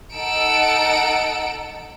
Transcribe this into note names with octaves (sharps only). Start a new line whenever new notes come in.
D#4 A4 F#5 E6 C#7 D7